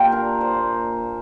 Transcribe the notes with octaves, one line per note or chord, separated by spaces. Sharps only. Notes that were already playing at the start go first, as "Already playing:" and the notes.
Already playing: A#2 A#3 F4 G4
D4 A#4
C5
A#2